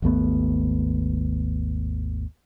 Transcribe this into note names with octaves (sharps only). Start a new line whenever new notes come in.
G#1 D#2 A3 B3